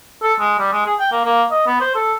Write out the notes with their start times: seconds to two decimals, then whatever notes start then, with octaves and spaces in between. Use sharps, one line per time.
0.23 A4
0.40 G#3
0.59 G3
0.72 G#3
0.86 G#4
0.99 G5
1.12 A#3
1.25 A#3
1.51 D#5
1.67 B3
1.81 C5
1.95 A4